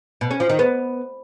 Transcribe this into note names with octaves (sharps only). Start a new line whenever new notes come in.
B2
C#4
F3
D#3
B3